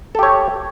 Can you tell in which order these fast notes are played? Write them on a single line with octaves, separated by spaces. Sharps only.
A4 G4 C#5